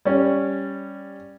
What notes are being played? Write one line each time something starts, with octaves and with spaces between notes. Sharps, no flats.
G3 C#4